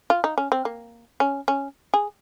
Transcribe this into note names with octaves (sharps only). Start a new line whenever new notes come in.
F4
D#4
C#4
C4
A#3
C#4
C#4
G#4